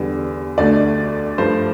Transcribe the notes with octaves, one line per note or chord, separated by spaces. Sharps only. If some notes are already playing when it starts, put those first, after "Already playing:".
Already playing: E2 D3 G3
D2 D3 A3 D5
G2 F3 A3 C5